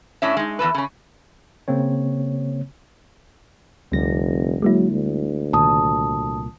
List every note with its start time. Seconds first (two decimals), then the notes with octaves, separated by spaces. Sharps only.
0.22 A2 C#4 D4 C#5 E5
0.37 G#3 D#4
0.59 E2 A#2 A4 B4
0.75 C#3 C#4
1.68 C#3 A#3 C4 C#5
3.92 F1 D2 D3 G3 C4 A#6
4.62 F#3 G#3 A#3 E4
4.91 D2
5.53 C2 A#2 D#3 A5 D#6